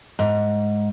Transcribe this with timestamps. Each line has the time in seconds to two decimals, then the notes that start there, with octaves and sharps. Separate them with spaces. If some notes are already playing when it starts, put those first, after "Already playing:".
0.19 G#2